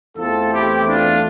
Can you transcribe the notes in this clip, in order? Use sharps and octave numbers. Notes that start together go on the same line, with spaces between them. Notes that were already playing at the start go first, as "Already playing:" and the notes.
E2 E3 A3 C4 F4 A4
E4 G4
D4 F4